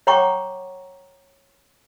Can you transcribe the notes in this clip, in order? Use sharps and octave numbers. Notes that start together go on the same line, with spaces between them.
C#5 F#5 G5 A#5 C#6 D6